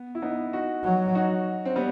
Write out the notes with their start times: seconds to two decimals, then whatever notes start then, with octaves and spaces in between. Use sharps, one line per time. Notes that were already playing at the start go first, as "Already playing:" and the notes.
Already playing: B3
0.15 E4
0.22 B3 D#4
0.53 D#4 F#4
0.84 F#3
1.15 D#4 F#4
1.65 C4
1.76 G3 B3